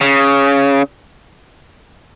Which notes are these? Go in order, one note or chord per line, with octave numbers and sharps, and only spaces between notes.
C#3